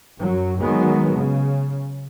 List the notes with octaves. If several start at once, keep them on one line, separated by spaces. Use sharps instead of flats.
F#2 F#3
D#3 F#3 G#3 B3
C#3